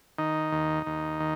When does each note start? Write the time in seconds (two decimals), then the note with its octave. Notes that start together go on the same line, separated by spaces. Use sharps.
0.18 D#3 D#4
0.52 D#2
0.86 D#2
1.20 D#3